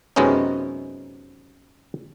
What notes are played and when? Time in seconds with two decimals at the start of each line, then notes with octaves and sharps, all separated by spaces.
0.16 F#2 C3 G#3 B3 C#4 D#4